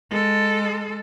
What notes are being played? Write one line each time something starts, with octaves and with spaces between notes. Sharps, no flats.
G#3 A4